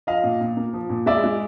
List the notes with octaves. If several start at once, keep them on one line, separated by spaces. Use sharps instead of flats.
F3 D#5 F5
A#2
A#2
A#3
F3
A#2
G#3 D5 E5
G#3